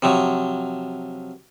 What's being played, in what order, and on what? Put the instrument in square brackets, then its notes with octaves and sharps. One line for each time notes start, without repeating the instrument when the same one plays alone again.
[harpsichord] C3 F3 F#3